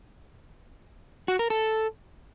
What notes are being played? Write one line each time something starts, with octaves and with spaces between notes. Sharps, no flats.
F#4
A#4
A4